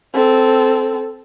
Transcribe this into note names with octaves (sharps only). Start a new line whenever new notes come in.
C4 A4